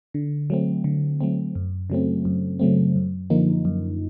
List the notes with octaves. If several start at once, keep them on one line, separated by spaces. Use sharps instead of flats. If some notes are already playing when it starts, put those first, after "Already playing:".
D3
F#3 A3 C4
D3
F#3 A3 C4
F#2
C#3 F#3 A3 C4
F#2
C#3 F#3 A3 C4
F#2
D3 F3 A#3 D#4
F#2